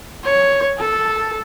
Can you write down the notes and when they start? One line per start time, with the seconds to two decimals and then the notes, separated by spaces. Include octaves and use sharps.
0.24 C#5
0.79 A4